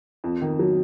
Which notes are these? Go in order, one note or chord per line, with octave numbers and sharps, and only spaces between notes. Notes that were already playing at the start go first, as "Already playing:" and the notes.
F2
D#3
F#3